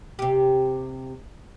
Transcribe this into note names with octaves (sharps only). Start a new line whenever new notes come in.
C3 G4